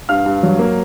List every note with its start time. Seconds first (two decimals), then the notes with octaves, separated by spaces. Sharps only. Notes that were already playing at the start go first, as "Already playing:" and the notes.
0.09 G2 F5 F6
0.26 G2
0.43 F#3
0.59 A#3